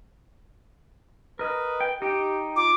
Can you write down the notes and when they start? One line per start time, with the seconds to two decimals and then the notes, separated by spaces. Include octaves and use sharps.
1.39 A#4 B4 D#5
1.80 G5
2.02 D#4 G4 G5
2.56 F4 D6